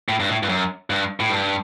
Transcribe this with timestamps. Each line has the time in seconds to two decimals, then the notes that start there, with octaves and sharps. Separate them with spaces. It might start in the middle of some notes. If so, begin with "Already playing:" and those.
0.09 A2
0.20 G2
0.29 A2
0.43 G2
0.49 F#2
0.90 G2
1.20 A2
1.30 G2